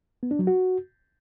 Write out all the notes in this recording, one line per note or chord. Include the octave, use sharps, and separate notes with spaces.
B3
D4
F#3
F#4